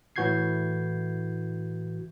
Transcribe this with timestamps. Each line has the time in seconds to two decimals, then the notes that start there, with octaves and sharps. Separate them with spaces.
0.16 A2 E3 F#4 G6 G#6 C7